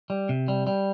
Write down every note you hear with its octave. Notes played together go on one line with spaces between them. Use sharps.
G3
C3
G3
G3